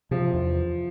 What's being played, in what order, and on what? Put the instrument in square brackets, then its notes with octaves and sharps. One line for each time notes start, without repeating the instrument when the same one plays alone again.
[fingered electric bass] C3 [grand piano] F3
[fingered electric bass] E2